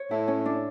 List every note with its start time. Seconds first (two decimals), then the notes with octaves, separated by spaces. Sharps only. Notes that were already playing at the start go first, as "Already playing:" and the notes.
Already playing: C#5
0.11 A2 E4
0.28 C#4
0.45 D4